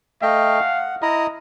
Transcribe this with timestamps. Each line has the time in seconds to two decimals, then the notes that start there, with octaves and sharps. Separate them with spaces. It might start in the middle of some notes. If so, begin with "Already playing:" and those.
0.22 A3 D#5 F5 G5
0.60 F#5
1.02 E4 D#5 A#5 D#6